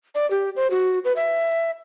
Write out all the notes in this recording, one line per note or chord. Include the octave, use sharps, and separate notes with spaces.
D5
G4
C5
F#4
B4
E5